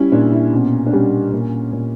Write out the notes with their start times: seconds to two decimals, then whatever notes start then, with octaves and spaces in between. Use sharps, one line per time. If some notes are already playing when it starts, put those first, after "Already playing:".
Already playing: G3 C#4 E4
0.12 A#2 D4
0.32 E4
0.53 B2 C#4
0.86 D4
0.93 G3 C#4
1.33 A#2
1.72 A#2